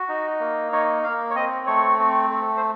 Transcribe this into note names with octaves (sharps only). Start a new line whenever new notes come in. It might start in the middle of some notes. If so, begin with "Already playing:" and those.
Already playing: F#4
D#4
A#3
D#4 C#5
A#3 F5
C#5
C4 D#5
A3 C#5
C4
A3
C5